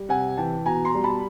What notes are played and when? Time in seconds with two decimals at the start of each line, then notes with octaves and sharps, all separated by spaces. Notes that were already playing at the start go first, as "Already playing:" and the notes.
Already playing: G3
0.09 C3 F#5 G#5
0.37 E3 G5 A5
0.66 B2 G#5 A#5
0.85 A#5 C6
0.95 G3
1.04 A5 B5